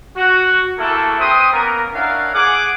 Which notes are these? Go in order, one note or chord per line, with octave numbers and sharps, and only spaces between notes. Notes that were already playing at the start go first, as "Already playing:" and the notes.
F#4
A3 A#3 E4 F#4 G#4 A4
C4 B4 G5 C6 D#6
A#3 B3 C#4 A#4
C#4 D4 E4 A#4 F5 F#5
G#4 F#5 D6